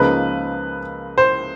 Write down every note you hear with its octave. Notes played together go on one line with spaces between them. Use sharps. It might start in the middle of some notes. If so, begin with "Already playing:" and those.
Already playing: C#2 C#3 F3 A#3 D#4 B4
C5